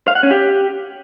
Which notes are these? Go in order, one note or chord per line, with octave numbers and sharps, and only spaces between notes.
F5
F#5
C#4
G4